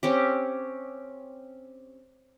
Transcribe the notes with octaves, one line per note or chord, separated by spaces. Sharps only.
C4 C#4 G4